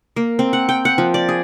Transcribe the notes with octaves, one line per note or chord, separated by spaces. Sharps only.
A#3
C4
F#5
G5
F#5
F3
D5
G#4